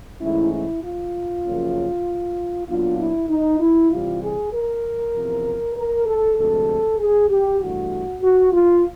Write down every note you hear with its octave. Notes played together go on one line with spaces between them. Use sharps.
G#2 E3 A3 C#4 E4
E4
F4
F#2 C#3 F3 A#3 C#4
A#2 F#3 B3 D4 F4
E4
D#4
E4
C3 E3 G3 F4
G#4
A#4
E2 C3 F3
A#4
A4
D2 C3 F3 G#3 A4
G#4
G4
G2 E3 A3 F#4
F#4
F4